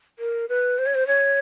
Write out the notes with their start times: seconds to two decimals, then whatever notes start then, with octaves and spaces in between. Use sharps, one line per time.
0.19 A#4
0.49 B4
0.79 C5
0.86 C#5
0.95 C5
1.07 C#5